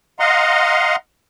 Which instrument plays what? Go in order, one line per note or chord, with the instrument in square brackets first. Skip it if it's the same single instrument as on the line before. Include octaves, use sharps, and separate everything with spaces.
[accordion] D#5 F5 F#5 A#5 C6